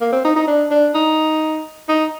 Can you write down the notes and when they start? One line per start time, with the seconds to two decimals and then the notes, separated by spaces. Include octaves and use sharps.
0.01 A#3
0.13 C4
0.25 D#4
0.36 D#4
0.47 D4
0.71 D4
0.95 D#4
1.89 D#4